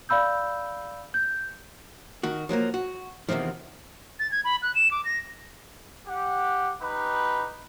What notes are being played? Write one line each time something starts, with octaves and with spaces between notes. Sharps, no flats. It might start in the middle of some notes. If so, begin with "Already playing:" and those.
D5 F5 B5 E6 G6
G6
D#3 F#4
F3 F#3 A3 A#3
F#4
E2 G#2 C3 D#3 F3
A6
G#6
B5
F#6
E7
D6
A#6
G4 F#5
D#4 G4 B4